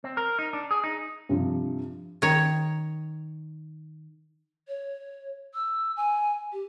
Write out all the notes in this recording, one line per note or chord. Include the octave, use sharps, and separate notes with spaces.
C4
A#4
D#4
D4
G#4
D#4
G2 C3 F3
D#3 C#5
C#5
E6
G#5
G4